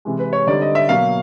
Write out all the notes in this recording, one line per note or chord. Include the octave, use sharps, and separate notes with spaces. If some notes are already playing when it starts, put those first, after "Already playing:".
C3 E3 G#3
B4
C#5
D3 G3 C4 D#4 D5
D#5
E5
B2 F#3 A#3 F5